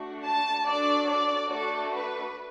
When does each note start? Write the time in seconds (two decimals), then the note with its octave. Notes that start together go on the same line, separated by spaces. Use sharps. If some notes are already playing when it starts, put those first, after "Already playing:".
Already playing: A3 D4 F#4
0.26 A5
0.67 D4 F#4 A4 D5
1.09 D5
1.51 A3 D4 F#4 A4
1.93 B4